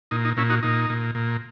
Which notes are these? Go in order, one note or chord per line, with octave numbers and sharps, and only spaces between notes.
A#2 D#4
D#4
A#2 C#4 E4
D#4 F#4
A#2 D#4
A#2
A#2